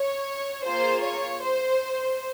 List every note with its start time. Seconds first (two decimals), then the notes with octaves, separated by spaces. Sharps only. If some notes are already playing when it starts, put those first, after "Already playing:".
Already playing: C#5
0.65 A#3 F4 G#4 C5
1.04 C#5
1.43 C5